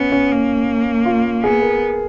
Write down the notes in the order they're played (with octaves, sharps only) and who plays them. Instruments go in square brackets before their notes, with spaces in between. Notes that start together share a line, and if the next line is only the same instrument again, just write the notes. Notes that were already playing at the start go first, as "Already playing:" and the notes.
Already playing: [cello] B3 [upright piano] C#4
[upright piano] C#4
[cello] A#3
[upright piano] F4
[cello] B3 [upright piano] G#4
[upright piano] A#4